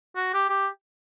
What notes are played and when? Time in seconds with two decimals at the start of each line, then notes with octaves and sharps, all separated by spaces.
0.16 F#4
0.34 G4
0.49 G4